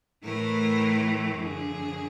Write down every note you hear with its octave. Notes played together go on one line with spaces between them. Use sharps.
A2 E3 A3 A#4
F#2 D3 F3 G#4